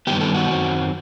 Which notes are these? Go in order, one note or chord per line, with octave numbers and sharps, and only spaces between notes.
G2 D#3 G3 B3 G4
A4
F#4
F#2 D#3 F#3 C4